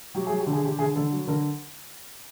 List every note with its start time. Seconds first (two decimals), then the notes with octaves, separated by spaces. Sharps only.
0.15 F#3 G4
0.27 F#3 G#4
0.40 G4
0.46 D3
0.53 G#4
0.63 D3 G4
0.79 D3 G#4
0.96 D3 A4
1.12 F#3
1.27 D3 A#4